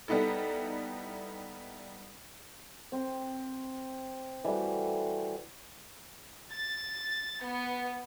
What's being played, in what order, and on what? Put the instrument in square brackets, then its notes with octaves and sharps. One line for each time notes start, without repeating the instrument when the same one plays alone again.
[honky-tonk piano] G3 B3 D#4 E4 A4
[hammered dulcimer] C4
E3 G3 A3 F#4
[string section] A6
B3